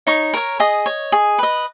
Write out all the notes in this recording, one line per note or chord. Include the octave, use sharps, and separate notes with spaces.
D#4 C#5 C#6
A#4 C#5
G#4 D#5 D#6
C#5
G#4
B4 D#5